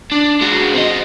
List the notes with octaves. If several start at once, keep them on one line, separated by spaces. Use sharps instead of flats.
D4
G#3 F#4
C4 D#5